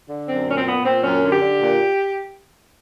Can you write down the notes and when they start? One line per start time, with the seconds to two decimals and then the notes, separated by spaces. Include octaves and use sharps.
0.09 D3
0.28 F#2 C4
0.47 A#2 C#4
0.57 C4
0.66 A#2 B3
0.84 A#2 C4
1.03 F#2 C#4
1.23 D3
1.32 G4
1.41 D3
1.60 A#2